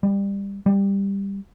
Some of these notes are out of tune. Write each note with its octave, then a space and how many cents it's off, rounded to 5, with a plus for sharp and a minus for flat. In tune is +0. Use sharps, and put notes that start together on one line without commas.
G3 +20
G3 +10